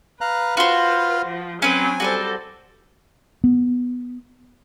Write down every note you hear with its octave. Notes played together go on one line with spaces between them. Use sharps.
B4 F5 A#5 F#6
F4 F#4 C5 F5
F3
F#3 C4 C#4 B4 G#5
G3 F#4 A4 B4 C5
B3